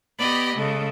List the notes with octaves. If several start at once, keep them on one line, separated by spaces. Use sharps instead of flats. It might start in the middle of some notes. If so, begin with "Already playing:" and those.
B3 G4 D5 D#5 B5
C#3 G#3 A4